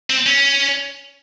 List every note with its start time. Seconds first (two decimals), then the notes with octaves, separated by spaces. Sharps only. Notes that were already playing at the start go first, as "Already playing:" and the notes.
0.10 C4
0.26 C#4